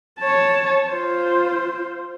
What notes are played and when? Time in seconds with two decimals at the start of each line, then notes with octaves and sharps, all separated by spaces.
0.20 C#5 A5
0.89 F4 C5